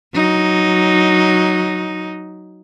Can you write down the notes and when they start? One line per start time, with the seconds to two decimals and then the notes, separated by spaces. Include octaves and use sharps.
0.14 F#3 D#4